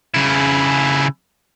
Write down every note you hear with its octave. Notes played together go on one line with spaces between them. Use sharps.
C#3 E4